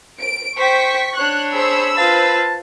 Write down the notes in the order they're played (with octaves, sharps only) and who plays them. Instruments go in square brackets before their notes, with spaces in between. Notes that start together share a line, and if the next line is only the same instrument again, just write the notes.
[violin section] D7
[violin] C5 G5 [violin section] C#6 B6
[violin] D4 C#5 [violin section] F#6
[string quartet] G#4 C5 [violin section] B5 E6
[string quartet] F4 B4 F5 [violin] C5 [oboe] A5